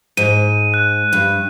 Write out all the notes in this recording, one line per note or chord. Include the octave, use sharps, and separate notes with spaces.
G#2 D#7
F#6
G2